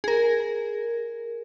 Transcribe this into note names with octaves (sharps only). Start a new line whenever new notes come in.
G#4 A#4